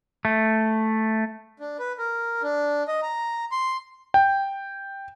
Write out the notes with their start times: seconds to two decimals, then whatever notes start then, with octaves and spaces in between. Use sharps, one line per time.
0.25 A3
1.60 D4
1.79 B4
1.98 A#4
2.42 D4
2.88 D#5
3.02 A#5
3.52 C6
4.14 G5